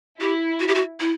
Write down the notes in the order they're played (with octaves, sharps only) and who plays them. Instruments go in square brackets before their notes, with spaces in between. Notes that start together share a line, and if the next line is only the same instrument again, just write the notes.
[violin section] E4 [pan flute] G4
[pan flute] F#4
G4
F#4
E4